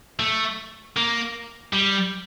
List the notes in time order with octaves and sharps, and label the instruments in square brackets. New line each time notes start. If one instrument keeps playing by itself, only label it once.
[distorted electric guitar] A3
A#3
G3